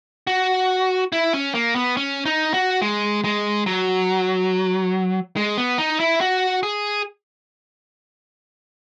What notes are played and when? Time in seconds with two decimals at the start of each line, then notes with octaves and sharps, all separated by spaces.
0.27 F#4
1.12 E4
1.34 C#4
1.54 A#3
1.75 B3
1.97 C#4
2.25 D#4
2.54 F#4
2.82 G#3
3.24 G#3
3.66 F#3
5.37 G#3
5.57 B3
5.78 D#4
6.00 E4
6.21 F#4
6.63 G#4